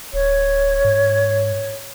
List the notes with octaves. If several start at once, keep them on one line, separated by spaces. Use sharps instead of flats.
D1 C#5
G#2